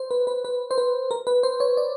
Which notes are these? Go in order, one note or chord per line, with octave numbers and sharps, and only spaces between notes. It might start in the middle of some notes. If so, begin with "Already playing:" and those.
Already playing: C5
B4
B4
B4
C5
B4
A#4
B4
C5
C#5
D5